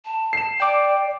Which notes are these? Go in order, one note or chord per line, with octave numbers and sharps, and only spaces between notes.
A5
C7 E7
D5 G5 D6